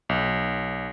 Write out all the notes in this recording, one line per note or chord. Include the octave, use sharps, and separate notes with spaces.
B1